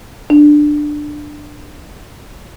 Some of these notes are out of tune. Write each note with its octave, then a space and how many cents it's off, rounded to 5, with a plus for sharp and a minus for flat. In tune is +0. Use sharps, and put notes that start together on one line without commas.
D4 +15